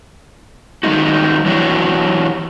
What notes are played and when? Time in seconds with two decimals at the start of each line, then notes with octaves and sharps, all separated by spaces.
0.83 D#3 G3 G#3 D#4 F#4
1.46 E3 F#3 D4 E4 F#4 G4